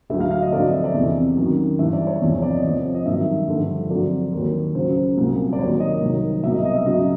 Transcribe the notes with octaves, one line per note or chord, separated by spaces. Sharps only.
D2 D3 F#3 E5
F5
F5
D#5
F2 D3 F#3 D5
D#5
E5
D5
E2 C3 E3
F#2 D#3 F#3
G2 E3 E5
D5
C#5
E2 C3 F3
C#5
D5
D#5
F2 C3 F3
D#5
G2 D#3 F#3 E5
G2 D3 F3
F2 D3 F#3 D5
D#2 D#3 F#3
C#2 C#3 F#3 C5
C2 A#2 F#3
D5
D#2 D#3 F#3 C#5
D#5
C2 C3 D#3 F#3
C2 B2 F#3 E5
D#5
D#5
E5
C#2 C#3 F#3 D#5